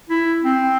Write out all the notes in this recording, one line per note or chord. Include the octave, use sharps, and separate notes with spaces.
E4
C4